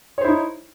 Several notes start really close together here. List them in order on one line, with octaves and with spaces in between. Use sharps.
C#5 C5 E4 D#4